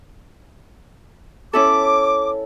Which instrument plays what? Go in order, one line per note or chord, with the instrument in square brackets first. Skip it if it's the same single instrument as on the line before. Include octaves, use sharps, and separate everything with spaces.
[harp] C#4 E4 A4 [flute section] D6